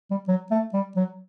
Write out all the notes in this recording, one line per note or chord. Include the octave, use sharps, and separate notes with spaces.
G3
F#3
A3
G3
F#3